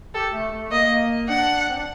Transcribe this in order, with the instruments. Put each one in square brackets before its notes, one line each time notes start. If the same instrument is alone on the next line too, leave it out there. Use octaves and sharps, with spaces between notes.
[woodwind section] G4 [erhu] A4
[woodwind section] A3
A3
[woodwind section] A#3 [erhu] D#5
[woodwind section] D4 [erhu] F#5
[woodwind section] C4
D4